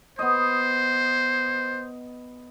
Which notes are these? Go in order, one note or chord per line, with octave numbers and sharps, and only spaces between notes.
B3 C5 D#5